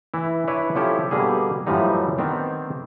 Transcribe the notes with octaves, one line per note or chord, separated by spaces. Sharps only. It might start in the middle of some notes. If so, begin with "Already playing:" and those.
E3 E4
D4 E4 B4 C#5 D5
D3 F3 C#4 E4 G4 A4
B2 D3 G3 A#3 G#4
F#2 A2 E3 F3 G3 D#4
D#3 B3 C4 D4